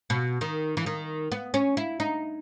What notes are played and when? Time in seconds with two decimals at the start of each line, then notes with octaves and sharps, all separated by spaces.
0.10 B2
0.41 D#3
0.77 E3
0.86 D#3
1.32 B3
1.54 C#4
1.77 E4
2.00 D#4